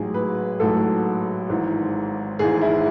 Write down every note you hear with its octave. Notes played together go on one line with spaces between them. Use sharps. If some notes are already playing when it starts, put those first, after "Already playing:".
Already playing: A1 G#2 F#3 G#4
B4
A1 G#2 F#3 A4
G#1 G#2 E3
G#1 G#2 E3 G#4
E4